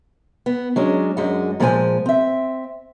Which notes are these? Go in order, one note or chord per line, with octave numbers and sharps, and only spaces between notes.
B3
F#3 G#3 C#4 D4
F#2 G#3 D4 F#4
A#2 F3 G#3 A#4 C5 G#5
C4 E5